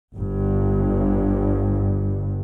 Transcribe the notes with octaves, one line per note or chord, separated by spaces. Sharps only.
G1 G2